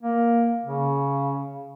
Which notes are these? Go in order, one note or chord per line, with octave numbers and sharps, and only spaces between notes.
A#3
C#3